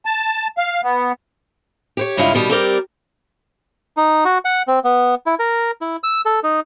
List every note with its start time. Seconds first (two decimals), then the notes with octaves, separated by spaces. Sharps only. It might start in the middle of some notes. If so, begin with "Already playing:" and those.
0.06 A5
0.58 F5
0.84 B3
1.97 G4 C5 C#5
2.17 G2 C#3 G3 G#3 E4 F4
2.34 B2 D#3 G3
2.49 G3 C4 G4 A#4 D5
3.97 D#4
4.25 F#4
4.45 F#5
4.68 C4
4.84 B3
5.26 E4
5.39 A#4
5.81 E4
6.04 E6
6.25 A4
6.44 D#4